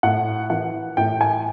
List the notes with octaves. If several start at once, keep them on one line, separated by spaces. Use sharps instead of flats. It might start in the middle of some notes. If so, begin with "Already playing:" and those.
A2 F#5
E3 F#5
A2 G5
G#5